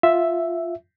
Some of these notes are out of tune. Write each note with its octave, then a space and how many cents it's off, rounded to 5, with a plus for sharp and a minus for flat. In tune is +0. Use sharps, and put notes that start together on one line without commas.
F4 +0 E5 +0